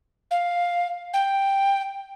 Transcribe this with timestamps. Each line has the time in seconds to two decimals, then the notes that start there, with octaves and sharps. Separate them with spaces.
0.31 F5
1.14 G5